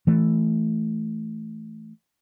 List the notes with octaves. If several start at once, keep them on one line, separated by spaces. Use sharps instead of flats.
E3 A3